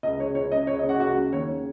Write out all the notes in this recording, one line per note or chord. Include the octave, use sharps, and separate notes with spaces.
C#2 D#5
C#3 C#5
C#2 C#5
C#3 D#5
C#2 C#5
D#5
C#3
F#4 F#5
C#2 F#4 F#5
C#3
D#2 C#5
C#3